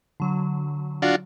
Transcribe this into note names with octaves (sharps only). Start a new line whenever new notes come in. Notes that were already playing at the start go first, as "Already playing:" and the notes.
D3 F#3
D4 F4 F#4